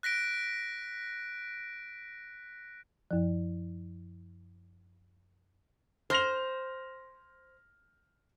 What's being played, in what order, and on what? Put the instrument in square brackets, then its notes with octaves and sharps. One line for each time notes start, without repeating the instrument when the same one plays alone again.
[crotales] F#6 A#6 B6 D7
[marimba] F#2 F3
[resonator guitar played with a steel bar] C5 [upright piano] F6 A#6 F7